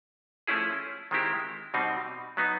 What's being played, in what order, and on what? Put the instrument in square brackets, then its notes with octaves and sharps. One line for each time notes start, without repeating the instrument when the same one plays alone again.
[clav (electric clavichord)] F3 A3 C#4 E4 G#4
D#3 G#3 C4 E4 G4
B2 G3 C4 D#4
F#3 B3 D#4